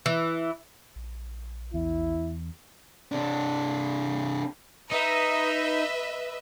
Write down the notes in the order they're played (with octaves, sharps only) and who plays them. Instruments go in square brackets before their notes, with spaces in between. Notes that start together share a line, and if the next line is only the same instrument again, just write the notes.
[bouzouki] E3
[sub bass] A#1
[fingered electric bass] E2 [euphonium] E4
[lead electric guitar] C3 D4
[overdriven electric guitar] D#4 [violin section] B4 D#5 E5